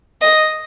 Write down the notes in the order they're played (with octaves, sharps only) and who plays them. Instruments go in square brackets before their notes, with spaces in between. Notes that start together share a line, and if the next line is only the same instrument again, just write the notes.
[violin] D#5